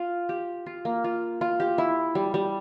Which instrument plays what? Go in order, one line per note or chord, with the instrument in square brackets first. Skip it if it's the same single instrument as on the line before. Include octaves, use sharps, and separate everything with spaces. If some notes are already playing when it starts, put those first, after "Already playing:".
Already playing: [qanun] F4
G4
F4
A#3
F4
F4
G4
E4
G3
G3